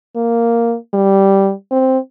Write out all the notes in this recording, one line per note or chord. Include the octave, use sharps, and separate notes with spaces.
A#3
G3
C4